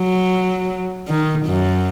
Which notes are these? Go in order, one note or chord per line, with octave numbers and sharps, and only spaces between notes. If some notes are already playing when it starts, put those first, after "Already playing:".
Already playing: F#3
D#3
F#2